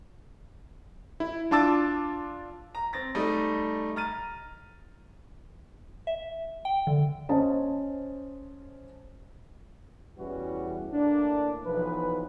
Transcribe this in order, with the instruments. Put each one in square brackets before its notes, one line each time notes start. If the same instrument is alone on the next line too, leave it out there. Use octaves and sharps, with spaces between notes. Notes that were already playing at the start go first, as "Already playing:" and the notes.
[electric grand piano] E4
D4 F4 A5 D6 E6 A6
[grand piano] A#5
C4 A6 A#6
G3 A3 D#4
A#5 F6 A6 D#7
[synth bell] E5
G5
D3
[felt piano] C#4 C5 D#5 A5
[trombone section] E2 E3 G3 C#4 F#4
A2 A#3 D4
B1 E3 F3 B4